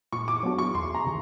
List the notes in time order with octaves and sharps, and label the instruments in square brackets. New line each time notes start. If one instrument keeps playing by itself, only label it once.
[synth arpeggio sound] A#2 [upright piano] C#6
[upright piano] D6
[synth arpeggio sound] F#3 B3 D4 F#4
[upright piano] C#6
[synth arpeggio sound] E2 [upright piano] C6
[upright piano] A#5
[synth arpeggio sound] C3 D#3